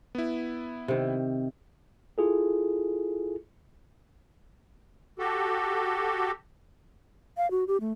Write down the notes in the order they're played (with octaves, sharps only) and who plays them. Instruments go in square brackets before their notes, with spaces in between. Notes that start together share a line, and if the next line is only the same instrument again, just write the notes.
[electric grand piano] B3 E4
[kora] C3 D#3
[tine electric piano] E4 F4 G#4 A4
[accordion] F#4 G4 A4
[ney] F5
F#4
G4
A3